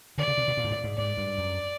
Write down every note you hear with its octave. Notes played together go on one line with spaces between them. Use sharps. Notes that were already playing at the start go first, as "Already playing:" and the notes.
D3 D5
C#3
C3
B2
A#2
G#2
A2
G#2
G#2 D5
G2
F#2